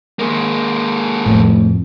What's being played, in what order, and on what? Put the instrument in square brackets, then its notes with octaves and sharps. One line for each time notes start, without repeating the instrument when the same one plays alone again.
[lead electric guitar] G#3 A#3
[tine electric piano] F2 A2 [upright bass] A3